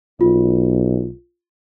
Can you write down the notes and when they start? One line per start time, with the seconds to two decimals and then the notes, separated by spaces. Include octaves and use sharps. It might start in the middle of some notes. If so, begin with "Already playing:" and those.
0.21 B1 F4